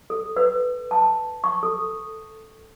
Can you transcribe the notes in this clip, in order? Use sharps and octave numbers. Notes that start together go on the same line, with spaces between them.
A4
B4
A5
C#6
A4